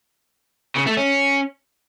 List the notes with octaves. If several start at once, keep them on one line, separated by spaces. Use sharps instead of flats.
C#3
A3
C#4